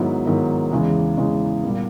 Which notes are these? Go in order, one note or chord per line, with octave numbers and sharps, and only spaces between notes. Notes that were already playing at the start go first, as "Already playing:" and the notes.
Already playing: G#2 D#3 F#3 B3 E4
G#2 D#3 F#3 B3 E4
E2 C#3 E3 G#3
E2 C#3 E3 G#3
A#2 G3 B3